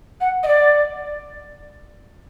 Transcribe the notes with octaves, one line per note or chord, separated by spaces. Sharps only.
F#5
D#5
D5